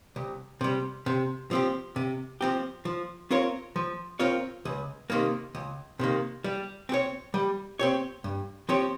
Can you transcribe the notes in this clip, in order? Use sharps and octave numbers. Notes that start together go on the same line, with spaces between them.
C2
C3 G3
C3
F3 C4 G4
C3
F3 C4 G4
F3
C4 F4 A#4 C#5
F3
C4 F4 A#4 C#5
C#2
C3 D#3 A#3
C#2
C3 D#3 A#3
G3
C4 G4 C#5
G3
C4 G4 C#5
G2
F3 C4 G4 C#5